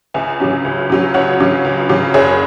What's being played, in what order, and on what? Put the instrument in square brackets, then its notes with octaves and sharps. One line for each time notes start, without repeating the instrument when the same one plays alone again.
[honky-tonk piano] C#2 E5 G#5
C#3 F#3 C#4
C#2
C#3 F#3 C#4
C#2 C#5 F#5
C#3 F#3 C#4
C#2
C#3 F#3 C#4
F#1 G#4 C#5